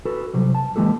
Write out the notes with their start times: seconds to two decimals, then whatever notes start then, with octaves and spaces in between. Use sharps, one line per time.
0.05 F#4 A4 B4
0.34 C3 F#3 G3
0.55 A5
0.76 E3 G#3 A#3 G4 A4